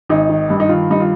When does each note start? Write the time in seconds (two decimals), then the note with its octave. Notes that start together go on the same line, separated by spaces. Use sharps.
0.09 G#1 D#4
0.29 D#3
0.50 G2
0.60 D#4
0.69 D#3 F4
0.90 G2 D#4
1.00 F4